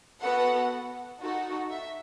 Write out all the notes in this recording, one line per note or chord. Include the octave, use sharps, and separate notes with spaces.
B3 F#4 A4 F#5
D#4 F#4 A4
E5